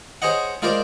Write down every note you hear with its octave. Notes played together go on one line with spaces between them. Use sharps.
G#4 C5 C#5 D#5 F#5
G#3 F4 A#4 C5 D5